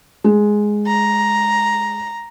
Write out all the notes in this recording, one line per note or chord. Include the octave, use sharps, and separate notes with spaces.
G#3
A#5